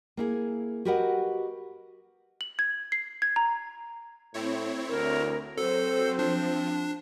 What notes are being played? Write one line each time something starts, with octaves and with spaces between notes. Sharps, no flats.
A#3 E4 G#4
F#4 G4 A#4 B4 D#5 F#5
F#7
G#6
C7
G#6
A#5
A2 C4 E4 C#5
D2 A#4
F#3 C4 A4 C5
F3 D4